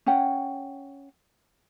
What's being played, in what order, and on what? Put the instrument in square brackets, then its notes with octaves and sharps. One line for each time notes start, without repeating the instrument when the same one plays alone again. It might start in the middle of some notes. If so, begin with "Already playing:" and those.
[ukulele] C#4 C#5 F#5 G5